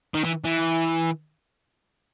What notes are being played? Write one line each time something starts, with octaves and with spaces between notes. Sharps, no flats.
D#3
E3
E3